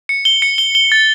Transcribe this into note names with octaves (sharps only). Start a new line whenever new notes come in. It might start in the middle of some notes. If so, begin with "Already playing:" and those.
C#7
G7
C#7
G7
G7
A6